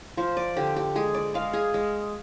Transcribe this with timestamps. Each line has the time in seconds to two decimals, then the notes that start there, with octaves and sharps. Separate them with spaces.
0.17 F3 C5
0.37 D5
0.57 D3 G4
0.76 G4
0.96 G#3 G#4
1.14 D5
1.34 G#3 F5
1.53 G#4
1.74 G#3